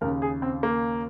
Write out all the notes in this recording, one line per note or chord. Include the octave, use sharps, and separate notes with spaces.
D#2 C#3 A#4
G#4
C4
A#3